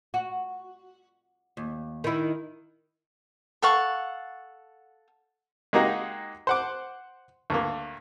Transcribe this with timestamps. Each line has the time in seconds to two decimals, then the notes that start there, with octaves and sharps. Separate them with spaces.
0.14 F#4
1.57 D#2
2.04 D#3 E4
3.62 A4 F5 F#5 C#6
5.73 G#3 A#3 D#4 F#4 G4
6.47 C5 F#5 D6
7.50 D2 G2 A#3